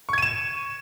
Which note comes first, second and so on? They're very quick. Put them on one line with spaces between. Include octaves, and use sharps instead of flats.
C#6 G#6 D#7 E7